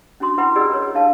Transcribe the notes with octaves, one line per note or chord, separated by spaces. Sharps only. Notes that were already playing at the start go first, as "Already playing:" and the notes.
C#4 D4 F#4 C6 D#6
E4 B4 F#5 G5 B5 C6
G4 G#4 B4 D5 D#5 E6
A#4 C#5
D4 F5 A5